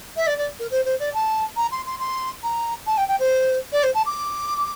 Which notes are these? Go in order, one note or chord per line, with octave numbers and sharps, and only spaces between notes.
E5
D5
D5
A#4
C5
C5
D5
A5
A#5
C6
C6
C6
A#5
A5
G5
G5
C5
D5
C5
A5
D6